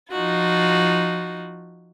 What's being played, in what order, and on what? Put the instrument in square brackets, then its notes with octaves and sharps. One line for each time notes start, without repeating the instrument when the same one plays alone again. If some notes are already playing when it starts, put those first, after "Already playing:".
[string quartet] F3 D#4 F4 F#4